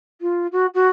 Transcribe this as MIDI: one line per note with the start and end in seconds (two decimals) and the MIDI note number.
0.21 0.47 65
0.52 0.66 66
0.74 0.88 66